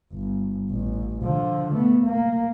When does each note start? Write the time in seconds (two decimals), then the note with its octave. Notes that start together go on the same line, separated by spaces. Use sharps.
0.13 G1
0.70 A1
1.23 D3 F3
1.73 A3 B3
2.05 A#3